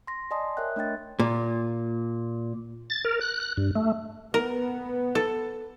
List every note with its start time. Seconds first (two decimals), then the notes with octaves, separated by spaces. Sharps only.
0.07 C6 A#6
0.31 D5 D#5 G#5 A5 C6 D#6
0.57 A#4 C#5 E5 G5 F#6
0.76 A3 D4 D#5 G5 A6
1.19 A#2
2.90 A6
3.05 A#4
3.21 F#6
3.40 F#6
3.57 G2
3.75 A3
4.34 B3 A#4
5.15 A4